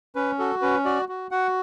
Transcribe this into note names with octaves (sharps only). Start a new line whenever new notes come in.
C#4 B4
F#4 A4
C#4 B4
F#4 D5
F#4
F#4 F#5